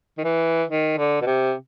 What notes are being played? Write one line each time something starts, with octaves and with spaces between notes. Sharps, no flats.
D#3
E3
D#3
D3
B2
C3